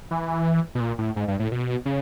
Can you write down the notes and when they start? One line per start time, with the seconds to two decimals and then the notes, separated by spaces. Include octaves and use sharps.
0.11 E3
0.75 B2
0.80 A#2
0.98 A2
1.16 G#2
1.28 G2
1.40 A2
1.52 B2
1.86 C#3